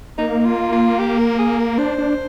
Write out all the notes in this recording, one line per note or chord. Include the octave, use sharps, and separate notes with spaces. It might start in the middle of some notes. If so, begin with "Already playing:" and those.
A#3 D#4
F4
F4
G4
A#4
G#4
A#4
D4 C5
D4